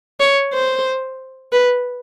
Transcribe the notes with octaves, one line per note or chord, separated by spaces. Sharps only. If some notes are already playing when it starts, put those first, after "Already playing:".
C#5
C5
B4